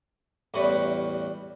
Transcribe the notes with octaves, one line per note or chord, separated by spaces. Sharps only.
A1 E2 G3 F#4 B4